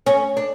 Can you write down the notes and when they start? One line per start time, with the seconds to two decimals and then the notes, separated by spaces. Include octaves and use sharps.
0.06 C#4
0.37 D4